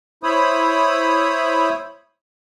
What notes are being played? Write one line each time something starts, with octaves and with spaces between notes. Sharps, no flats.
E4 C5 C#5 E5 B5 D#6